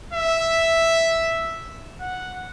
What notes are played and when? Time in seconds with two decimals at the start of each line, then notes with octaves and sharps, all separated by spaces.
0.13 E5
2.00 F#5